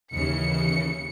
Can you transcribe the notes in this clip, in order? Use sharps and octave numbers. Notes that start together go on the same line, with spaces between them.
D#2 C#3 E3 C#7